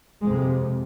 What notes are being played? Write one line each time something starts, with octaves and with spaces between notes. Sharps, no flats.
F2 C3 G#3